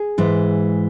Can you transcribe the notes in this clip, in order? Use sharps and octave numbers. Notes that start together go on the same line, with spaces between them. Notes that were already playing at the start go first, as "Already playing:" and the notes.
Already playing: G#4
G#2 E3 G#3